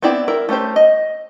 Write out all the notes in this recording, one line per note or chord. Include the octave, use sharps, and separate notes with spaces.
B3 C4 E4 D5 G5
E4 A#4
A3 C#4 G4 C5
D#5